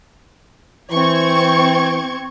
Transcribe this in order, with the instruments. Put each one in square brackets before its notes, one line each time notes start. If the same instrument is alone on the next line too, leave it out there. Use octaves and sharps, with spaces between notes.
[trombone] E3 [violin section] C4 C#6 G#6